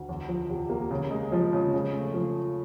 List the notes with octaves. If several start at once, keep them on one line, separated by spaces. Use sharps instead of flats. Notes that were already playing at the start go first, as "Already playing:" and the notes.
Already playing: D2
E2
F3
C3
A#3
C#3
G#3
F3
C#3
C#3
A3
F3